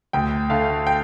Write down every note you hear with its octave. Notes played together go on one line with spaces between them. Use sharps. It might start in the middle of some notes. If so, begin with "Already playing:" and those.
D2 G5
D3 A3 F5
G5